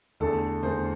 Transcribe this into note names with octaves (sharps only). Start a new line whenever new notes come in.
E2 D3 A3 A4
E2 D3 A3 C5